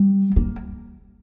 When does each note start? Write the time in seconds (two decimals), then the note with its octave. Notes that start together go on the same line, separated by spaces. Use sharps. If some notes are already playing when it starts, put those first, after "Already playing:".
Already playing: G3
0.36 A#3